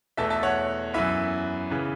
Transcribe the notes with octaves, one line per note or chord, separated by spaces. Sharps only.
E2 B2 A3 E5 A5
E5 A5
C#5 F#5
F#2 E3 B3 B4 E5
C#3 E3 B3